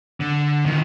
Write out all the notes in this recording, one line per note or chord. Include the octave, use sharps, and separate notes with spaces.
D3
D#3 F3